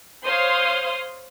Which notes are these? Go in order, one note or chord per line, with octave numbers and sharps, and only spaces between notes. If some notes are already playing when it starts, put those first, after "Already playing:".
C5 C#5 F5 C6 D#6